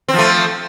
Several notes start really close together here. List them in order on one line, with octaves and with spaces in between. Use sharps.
C4 F3 A3